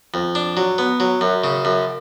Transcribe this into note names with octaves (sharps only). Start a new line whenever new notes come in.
F2
D4
F#3
B3
F#3
F#2
C#3
F#2